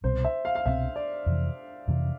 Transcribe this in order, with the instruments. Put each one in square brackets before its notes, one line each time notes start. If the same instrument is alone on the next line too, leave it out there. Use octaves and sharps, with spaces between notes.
[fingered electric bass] C2 B2 G3 C4 [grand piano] C5
[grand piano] E5
F5
F5
[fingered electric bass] C2 B2 G3 C4 [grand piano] E5
[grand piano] D5
[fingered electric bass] F2 C3 E3
F2 C3 E3